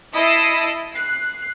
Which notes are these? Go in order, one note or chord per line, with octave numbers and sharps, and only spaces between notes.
E4 D#5 A5 D#6 E6 C7
F#6 C7